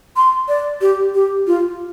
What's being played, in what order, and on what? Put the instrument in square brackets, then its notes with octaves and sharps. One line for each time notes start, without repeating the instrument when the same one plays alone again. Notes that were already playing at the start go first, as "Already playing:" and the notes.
[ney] C6
D5
G4
G4
F4